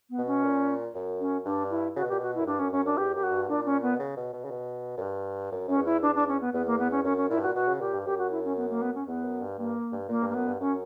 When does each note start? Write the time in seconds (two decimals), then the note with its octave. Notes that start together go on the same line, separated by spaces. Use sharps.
0.10 B3
0.18 B2
0.27 C#4
0.43 A#2
0.95 F#2
1.20 C#4
1.45 G2 D4
1.70 E4
1.96 C#3 F#4
2.03 B2
2.09 A#2 G4
2.18 B2 F#4
2.35 E4
2.40 F#2
2.46 G2 D4
2.59 F#2 C#4
2.72 F#2 C#4
2.85 F#2 D4
2.97 E2 G4
3.15 F#2 G4
3.23 F#4
3.31 G2
3.49 A#2 D4
3.65 C#4
3.82 B3
3.94 B2
3.99 C#3
4.17 B2
4.33 B2
4.44 C#3
4.51 B2
4.97 F#2
5.02 G2
5.52 F#2
5.68 F#2 C#4
5.77 E2
5.85 E4
6.02 E2 D4
6.15 D4
6.28 C#4
6.41 B3
6.54 E2 B3
6.66 A#3
6.79 B3
6.91 C#4
7.04 F#2 C#4
7.17 C#4
7.30 A#2 E4
7.37 G2
7.43 A#2 F#4
7.55 B2 F#4
7.68 C#3
7.80 A#2 G4
7.93 G2
8.05 F#2 G4
8.18 F#4
8.31 E4
8.44 C#4
8.57 B3
8.70 A#3
8.82 B3
8.95 C#4
9.07 E2 B3
9.24 F#2
9.41 G2
9.58 G2 A#3
9.92 G2
10.09 A#2 A#3
10.22 G2
10.29 A#3
10.34 F#2 B3
10.48 G2
10.60 F#2 C#4